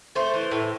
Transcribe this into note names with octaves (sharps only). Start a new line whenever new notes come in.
A3 C5
E3
A2